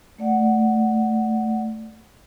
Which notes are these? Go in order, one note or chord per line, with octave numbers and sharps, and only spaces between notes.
A3 D5 F#5